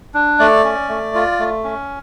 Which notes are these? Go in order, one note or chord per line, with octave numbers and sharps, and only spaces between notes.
D4
A3 D5
C#4
A3
F4
A3
C#4